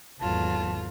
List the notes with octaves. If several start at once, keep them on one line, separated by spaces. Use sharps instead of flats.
G#1 E2 F#3 A3 F4 A5